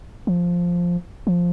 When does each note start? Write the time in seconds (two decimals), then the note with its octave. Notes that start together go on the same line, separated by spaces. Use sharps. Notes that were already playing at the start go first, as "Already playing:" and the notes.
0.27 F3
1.27 F3